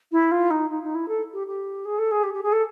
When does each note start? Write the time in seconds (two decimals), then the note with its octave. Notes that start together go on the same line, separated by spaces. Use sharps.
0.12 E4
0.31 F4
0.50 D#4
0.70 D#4
0.83 D#4
0.95 E4
1.08 A4
1.33 G4
1.47 G4
1.85 G#4
1.98 A4
2.11 G#4
2.23 G4
2.33 G4
2.43 G#4
2.52 A4